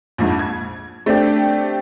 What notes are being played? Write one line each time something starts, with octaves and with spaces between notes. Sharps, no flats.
A#1 F2 G#2
G#6
A3 C4 D4 G4